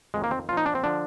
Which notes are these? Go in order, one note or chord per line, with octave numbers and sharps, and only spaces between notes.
F2 D#3 G#3
A#3
C4
A#2 F3 D#4 F4
D4
C4
D3 F3 D4